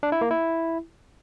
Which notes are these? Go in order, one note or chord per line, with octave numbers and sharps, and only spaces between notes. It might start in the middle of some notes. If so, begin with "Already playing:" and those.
D4
E4
A#3
E4